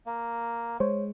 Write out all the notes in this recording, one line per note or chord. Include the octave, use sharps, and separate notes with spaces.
A#3
G#3 C5 C#5